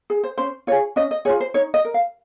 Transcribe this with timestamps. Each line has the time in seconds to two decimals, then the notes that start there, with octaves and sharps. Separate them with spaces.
0.10 G#4
0.24 C5
0.38 C#4 C5
0.67 F4 C#5
0.72 G#4
0.96 C#4 D#5
1.11 D#5
1.25 G#4 C#5
1.29 F4
1.40 C5
1.54 D#4 C#5
1.74 D#5
1.85 A#4
1.94 F5